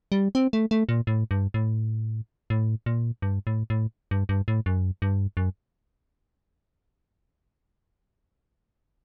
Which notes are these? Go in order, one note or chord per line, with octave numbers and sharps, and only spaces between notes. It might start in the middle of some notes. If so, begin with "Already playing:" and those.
G3
C4
A3
A3
A#2
A2
G2
A2
A2
A#2
G2
A2
A2
G2
G2
A2
F#2
G2
F#2